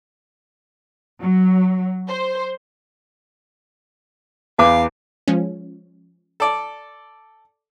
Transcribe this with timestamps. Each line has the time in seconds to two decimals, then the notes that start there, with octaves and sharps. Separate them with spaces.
1.21 F#3
2.09 C5
4.58 E2 B4 F5 D6
5.28 F3 G#3 C#4
6.40 A4 D5